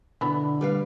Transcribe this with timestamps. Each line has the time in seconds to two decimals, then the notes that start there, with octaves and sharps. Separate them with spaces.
0.21 B2 D3 E3 B3 D4 E4 B5
0.61 G3 B4 F5